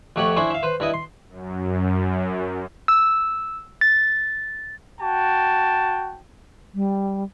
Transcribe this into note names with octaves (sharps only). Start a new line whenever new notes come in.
F2 A3 G4 C#5 F#5
C#4 D4 E4 C5
E5 F5
B4 C5
G2 E4 D#5
C6
F#2
E6
A6
F#4 G5 A5
G3